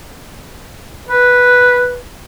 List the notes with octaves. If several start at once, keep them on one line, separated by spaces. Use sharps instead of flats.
B4